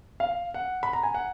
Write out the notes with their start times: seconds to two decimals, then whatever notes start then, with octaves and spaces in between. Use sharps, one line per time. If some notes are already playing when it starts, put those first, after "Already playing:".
0.20 F5
0.54 F#5
0.83 B5
0.93 A#5
1.03 G#5
1.15 F#5